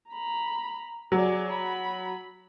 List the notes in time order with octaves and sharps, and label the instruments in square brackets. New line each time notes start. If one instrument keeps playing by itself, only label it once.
[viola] A#5 B5
[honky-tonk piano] F#3 [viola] G#4 D5
[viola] B5